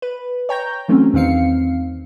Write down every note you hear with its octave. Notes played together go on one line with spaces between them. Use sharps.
B4
C#5 G5 A#5 G6
E3 F#3 A3 C4 C#4
E2 D#3 C4 F5 C7 C#7